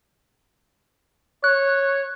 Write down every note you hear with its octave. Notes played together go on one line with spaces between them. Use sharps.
C#5 F#6